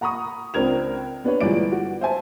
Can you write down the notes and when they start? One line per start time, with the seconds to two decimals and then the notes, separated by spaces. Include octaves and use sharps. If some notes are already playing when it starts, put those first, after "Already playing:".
0.01 F#5 A#5 B5 C#6 D#6
0.54 C#2 C4 D4 A#4 G#6 F7
1.24 B3 D4 B4 C#5
1.41 G1 A#2 E3 G#3 D5 D7
1.72 F#4
2.01 C5 E5 G#5 A5